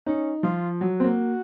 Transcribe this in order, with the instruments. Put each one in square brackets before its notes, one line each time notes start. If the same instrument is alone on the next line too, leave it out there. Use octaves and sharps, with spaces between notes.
[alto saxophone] C#4 [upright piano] D#4
[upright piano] F3 [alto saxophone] F4
[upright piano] F#3 [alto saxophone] F#4
[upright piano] C4
A#3